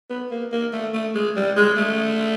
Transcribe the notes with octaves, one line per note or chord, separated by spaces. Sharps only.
B3
A#3
A#3
A3
A3
G#3
G3
G#3
A3